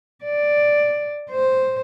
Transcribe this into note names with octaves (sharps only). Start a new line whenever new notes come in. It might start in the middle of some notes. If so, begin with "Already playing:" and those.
D5
C5